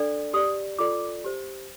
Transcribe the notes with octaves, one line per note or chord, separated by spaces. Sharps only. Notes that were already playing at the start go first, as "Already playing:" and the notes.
Already playing: D4 A4 D5
G4 D5 D#6
F4 A4 D5 D6
G4 C5